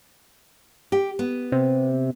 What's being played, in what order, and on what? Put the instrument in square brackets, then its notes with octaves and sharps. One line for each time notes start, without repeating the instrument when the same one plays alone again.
[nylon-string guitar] G4
B3
[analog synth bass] C3